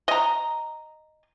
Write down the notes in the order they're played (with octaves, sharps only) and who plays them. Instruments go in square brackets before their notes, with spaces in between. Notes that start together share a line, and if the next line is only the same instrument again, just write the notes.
[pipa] D#5 A#5